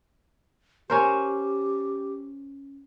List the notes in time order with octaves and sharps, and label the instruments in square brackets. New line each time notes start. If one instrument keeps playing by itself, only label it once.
[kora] C#4 A#4 C5 [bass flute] G4